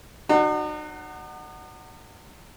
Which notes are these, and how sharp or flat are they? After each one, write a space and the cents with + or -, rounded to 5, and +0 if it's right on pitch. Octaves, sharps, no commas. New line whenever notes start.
F#3 +0 D#4 -45 F#4 +10